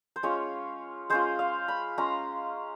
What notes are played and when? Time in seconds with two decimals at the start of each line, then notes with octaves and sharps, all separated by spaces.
0.16 C5
0.23 G#3 C#4 F4 C#5
1.10 G#3 C#4 F4 C5
1.39 F5
1.68 B5
1.98 G#3 C#4 F4 A#5